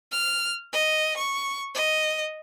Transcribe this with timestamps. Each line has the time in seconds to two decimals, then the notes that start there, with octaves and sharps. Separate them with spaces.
0.12 F6
0.73 D#5
1.18 C#6
1.75 D#5